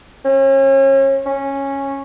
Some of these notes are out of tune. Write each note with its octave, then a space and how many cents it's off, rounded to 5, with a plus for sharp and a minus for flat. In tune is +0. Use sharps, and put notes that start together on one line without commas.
C#4 -35
C#4 -10